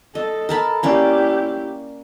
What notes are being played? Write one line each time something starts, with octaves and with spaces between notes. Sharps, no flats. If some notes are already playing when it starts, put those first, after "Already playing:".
A4 D#5
A#4 A5 B5
A#3 C#4 E4 G4 D5